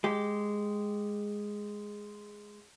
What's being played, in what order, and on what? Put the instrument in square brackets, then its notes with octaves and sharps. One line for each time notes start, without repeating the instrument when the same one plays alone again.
[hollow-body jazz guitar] G#3 G4